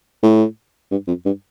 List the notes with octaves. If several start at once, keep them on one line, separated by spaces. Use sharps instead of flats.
A2
G2
F2
G2